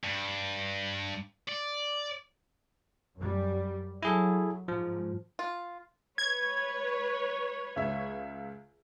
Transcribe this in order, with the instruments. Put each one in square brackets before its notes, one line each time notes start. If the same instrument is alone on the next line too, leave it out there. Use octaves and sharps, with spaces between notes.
[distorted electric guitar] G2
D5
[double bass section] F#2 G3
[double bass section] F#3 [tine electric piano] E4 G#4 A4
[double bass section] G#2 [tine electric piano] F3
[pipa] F4
[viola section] B4 C#5 [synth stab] G#6
[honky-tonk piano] C#2 E5